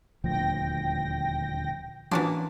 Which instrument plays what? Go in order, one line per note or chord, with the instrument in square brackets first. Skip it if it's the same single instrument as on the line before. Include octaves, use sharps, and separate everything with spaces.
[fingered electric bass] D#1 D2 F3 [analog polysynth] G5 A#6
[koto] E3 A#3 D4 [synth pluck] F3 C#4 F#4